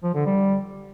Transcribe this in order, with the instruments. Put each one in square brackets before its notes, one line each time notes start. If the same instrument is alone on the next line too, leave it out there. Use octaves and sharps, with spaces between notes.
[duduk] F3
D3
G3